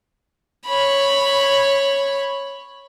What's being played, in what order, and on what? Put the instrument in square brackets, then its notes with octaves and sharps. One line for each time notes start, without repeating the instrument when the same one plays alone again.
[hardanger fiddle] C#5 B5